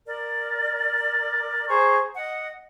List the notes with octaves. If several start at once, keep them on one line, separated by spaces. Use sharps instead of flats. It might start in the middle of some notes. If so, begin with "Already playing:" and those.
A#4 D5
G#4 C5 A#5 C#6
D#5 F#5